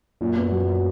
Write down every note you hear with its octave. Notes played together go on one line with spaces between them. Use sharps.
F#2 A#2
B3
F#3